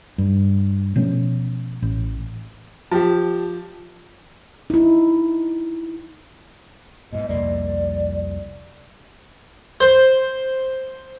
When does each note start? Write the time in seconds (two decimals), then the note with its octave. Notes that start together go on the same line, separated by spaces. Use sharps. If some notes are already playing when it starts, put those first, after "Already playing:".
0.18 G2
0.96 B2 F3 A3 C#4
1.82 A1
2.91 F3 G4 A5
4.70 D#4 E4
7.13 G#2 B2 D#5
7.29 C2 F2 A#3 D5
9.81 C5